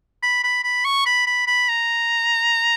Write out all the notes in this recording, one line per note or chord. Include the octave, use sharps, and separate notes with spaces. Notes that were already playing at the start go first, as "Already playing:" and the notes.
B5
B5
B5
C#6
B5
B5
B5
A#5